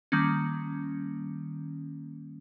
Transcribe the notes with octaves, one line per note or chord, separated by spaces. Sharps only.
D#3 G3 A#3 C#4